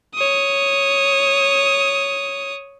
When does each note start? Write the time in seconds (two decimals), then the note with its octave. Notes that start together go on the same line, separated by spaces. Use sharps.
0.14 C#5 D#6